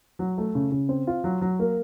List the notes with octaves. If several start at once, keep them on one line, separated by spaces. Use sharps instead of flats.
F#3
A3
C#3
C#3
C4
F4
F#3
F#3
A#3